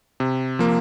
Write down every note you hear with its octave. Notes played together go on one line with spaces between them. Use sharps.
C3
F3 A#3